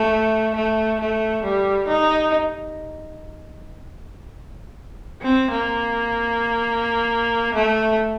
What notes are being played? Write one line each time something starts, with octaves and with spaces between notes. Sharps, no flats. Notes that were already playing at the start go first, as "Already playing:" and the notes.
Already playing: A3
A3
A3
G3
D#4
C4
A#3
A3